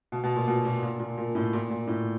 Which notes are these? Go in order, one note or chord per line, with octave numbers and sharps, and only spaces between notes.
B2
B2
A#2
B2
A#2
A#2
A#2
A#2
A2
A#2
A#2
A2